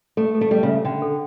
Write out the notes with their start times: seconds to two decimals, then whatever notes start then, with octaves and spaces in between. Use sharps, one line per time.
0.17 A3 A4
0.35 A4
0.41 A3
0.51 G3 A4
0.63 C#3
0.68 E5
0.85 D3 G5
1.02 A4